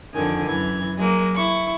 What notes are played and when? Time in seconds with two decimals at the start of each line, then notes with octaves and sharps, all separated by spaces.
0.13 F2 D3 D#3 G#5
0.47 F#2 E3 G#6
0.96 F#3 G#3 A#3
1.35 E4 C#6